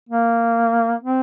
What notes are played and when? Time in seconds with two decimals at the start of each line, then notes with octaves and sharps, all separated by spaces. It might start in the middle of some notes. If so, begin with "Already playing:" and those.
0.10 A#3
1.03 C4